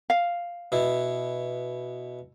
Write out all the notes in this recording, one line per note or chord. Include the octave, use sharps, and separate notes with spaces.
F5
B2 E4